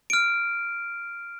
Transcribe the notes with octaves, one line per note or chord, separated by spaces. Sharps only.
F6 D7